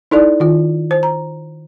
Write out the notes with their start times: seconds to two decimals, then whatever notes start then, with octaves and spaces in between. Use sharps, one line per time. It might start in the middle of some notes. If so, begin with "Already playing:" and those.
0.11 D#4 E4 A4 D5
0.40 D#3 F4
0.91 C5
1.03 A#5